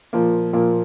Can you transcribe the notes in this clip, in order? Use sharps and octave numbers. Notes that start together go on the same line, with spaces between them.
A#2 F3 A#3
A#2 F3 A#3